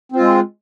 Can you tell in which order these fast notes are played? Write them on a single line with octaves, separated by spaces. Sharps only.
C4 F4 G#3